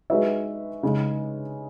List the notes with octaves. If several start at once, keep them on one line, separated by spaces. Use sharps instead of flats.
G#3 D#4 F#4 B4 E5
C#3 G#3 D#4